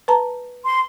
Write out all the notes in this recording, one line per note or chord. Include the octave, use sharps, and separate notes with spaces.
B4 A5 A#5
C6